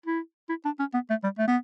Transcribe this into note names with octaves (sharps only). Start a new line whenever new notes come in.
E4
E4
D4
C#4
B3
A3
G3
A3
B3